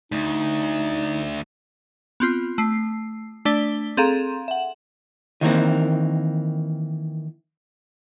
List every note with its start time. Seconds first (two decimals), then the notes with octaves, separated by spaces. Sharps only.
0.12 D2 D#4
2.20 B3 C4 F4
2.58 A3 C7
3.45 A3 D4 D5 B6 G7
3.97 C4 G#4 A4 F5 A#5 C6
4.48 E5 F#5
5.41 D#3 E3 A#3 C4